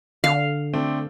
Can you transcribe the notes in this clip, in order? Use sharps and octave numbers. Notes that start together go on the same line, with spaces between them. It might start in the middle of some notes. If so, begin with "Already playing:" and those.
D3 F5
A3 C4 D4